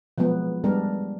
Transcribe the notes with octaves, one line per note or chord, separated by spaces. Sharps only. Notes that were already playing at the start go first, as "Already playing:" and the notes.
F3 F#3 G#3 B3
G3 G#3 B3 D4 A#4